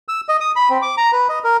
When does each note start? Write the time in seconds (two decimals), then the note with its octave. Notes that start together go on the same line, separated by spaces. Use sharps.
0.08 E6
0.29 D#5
0.40 D#6
0.56 B5
0.70 C4
0.82 D6
0.98 A#5
1.13 B4
1.29 D#5
1.44 A#4